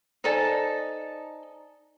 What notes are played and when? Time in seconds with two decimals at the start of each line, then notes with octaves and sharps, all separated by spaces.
0.24 D#4 A4 C5 D5 G#5 A5